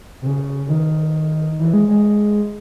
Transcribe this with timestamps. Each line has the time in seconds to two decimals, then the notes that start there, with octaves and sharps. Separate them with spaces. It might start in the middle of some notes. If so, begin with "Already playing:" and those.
0.22 C3
0.27 C#3
0.66 C#3
0.70 D#3
1.59 E3
1.73 G#3
1.87 G#3